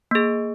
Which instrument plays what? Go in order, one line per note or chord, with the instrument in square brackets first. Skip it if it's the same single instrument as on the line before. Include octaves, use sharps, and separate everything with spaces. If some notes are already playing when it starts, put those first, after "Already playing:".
[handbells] A#3 G#4